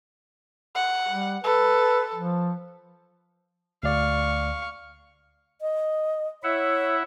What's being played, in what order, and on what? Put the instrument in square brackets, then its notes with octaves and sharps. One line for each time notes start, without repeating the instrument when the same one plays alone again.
[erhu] F#5
[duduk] G3
[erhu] A4 [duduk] B4
[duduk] F3
[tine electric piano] D2 D5 [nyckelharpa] F5 C#6
[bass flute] D#5
[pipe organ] E4 E5 F#5 [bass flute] C#5